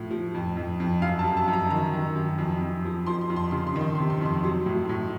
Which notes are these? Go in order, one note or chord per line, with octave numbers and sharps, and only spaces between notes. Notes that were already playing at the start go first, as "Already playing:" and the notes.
Already playing: A2 F3
F3
F2
F2
F2
F#2 F5
A5
F#2
A5
F#2
A#5
D#3 A#5
D#3
F#2
F2
F2
F3
F3 C6
C6
F2
C6
C#3 C6
C6
D#3
C6
C6
C3
C6
F2 C6
F#3
A2
A2